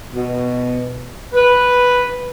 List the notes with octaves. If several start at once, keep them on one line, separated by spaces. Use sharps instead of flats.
B2
B4